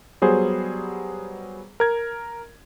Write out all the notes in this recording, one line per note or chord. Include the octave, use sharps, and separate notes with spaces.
F#3 G3 B3 G#4 C5
A#4 G#6